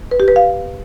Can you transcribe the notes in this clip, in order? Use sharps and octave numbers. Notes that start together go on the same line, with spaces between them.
B4
G4
B4
F5